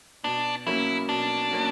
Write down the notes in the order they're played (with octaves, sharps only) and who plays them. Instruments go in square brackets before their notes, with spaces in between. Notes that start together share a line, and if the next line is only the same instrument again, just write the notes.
[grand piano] B2 [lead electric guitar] D4
[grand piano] F#3 A#3 C#4 [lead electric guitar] E4
[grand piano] B2 [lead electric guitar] D4
[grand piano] F#3 A#3 C#4